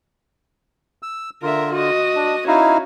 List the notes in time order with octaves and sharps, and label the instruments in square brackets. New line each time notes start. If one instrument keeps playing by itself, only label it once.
[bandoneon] E6
[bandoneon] D3 F4 [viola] A#4 E5
[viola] F#4 D#5
[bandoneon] D4
[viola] C#4 F#4 [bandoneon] D#4 E4 F5